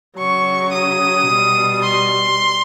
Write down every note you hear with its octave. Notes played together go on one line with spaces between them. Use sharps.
C#3 F#3 C#6
D#6
B2 G3
C6